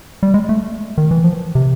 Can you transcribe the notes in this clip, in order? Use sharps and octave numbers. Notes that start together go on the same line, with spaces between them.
G3
G#3
A3
D#3
E3
F3
C3